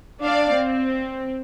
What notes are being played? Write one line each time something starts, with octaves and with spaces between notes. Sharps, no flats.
D4 D5 F5
C4